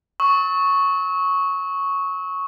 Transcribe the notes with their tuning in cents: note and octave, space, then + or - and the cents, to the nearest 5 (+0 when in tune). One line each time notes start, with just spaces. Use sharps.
C#6 +0 E6 -45